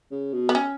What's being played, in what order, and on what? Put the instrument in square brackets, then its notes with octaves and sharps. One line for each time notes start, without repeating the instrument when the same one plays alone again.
[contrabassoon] C#3
B2
[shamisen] B3
C#4